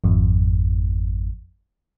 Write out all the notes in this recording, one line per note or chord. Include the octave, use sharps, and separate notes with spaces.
G#1 F2